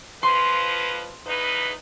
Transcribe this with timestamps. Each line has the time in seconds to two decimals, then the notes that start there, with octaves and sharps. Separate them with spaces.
0.23 F2 F3 B4 C6
1.25 E2 D#4 B4